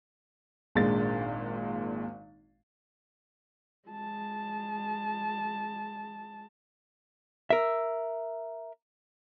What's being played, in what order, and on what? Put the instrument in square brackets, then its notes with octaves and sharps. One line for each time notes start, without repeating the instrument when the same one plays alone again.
[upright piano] G#1 A#2 G#3 D4 A6
[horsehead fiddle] G#3 A5
[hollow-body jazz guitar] A#4 E5